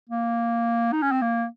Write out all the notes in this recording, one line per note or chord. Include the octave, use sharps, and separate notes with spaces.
A#3
D#4
C#4
C4
A#3